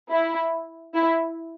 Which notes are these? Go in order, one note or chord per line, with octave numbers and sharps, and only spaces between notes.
E4
E4